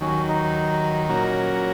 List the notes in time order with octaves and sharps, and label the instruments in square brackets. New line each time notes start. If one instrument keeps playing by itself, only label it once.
[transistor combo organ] D#2 D#3 F#3 [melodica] C#4
[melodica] D#4
[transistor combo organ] A#2 F#3 C#4 F#4 A#4